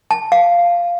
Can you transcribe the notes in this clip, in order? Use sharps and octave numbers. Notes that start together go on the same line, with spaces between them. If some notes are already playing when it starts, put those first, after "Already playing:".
A5
F5